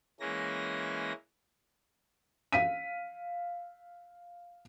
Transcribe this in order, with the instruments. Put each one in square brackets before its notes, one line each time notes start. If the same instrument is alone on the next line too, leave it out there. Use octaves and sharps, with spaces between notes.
[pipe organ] E3 G#3 A#3 C#4 A#6
[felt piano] F5 B6 D#7